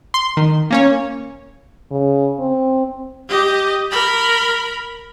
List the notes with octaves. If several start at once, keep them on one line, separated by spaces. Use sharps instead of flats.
C6
D#3
A#3 C#4 C#5
C#3
C4
G4 D#5
A#4 B5